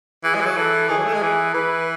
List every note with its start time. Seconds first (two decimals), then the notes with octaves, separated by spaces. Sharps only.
0.24 E3 G#4
0.35 G#3
0.41 E3
0.46 F#3
0.57 E3 A4
0.89 D#3 G#4
0.98 F#3
1.06 A3
1.14 G#3
1.22 E3 G#4
1.54 E3 B4